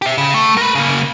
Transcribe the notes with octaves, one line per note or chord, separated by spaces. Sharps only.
G4 E5
C#3
A3
A#4 B4
C#3 A#3